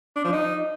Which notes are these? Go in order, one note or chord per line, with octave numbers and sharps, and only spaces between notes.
D4
F3
D#4